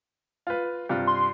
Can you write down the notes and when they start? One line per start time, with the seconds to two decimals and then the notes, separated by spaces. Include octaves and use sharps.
0.47 F4 B4
0.89 G2 C3 F4
1.07 C6